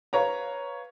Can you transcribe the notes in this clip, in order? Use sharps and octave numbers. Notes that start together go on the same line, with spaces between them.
B4 C#5 F5 A#5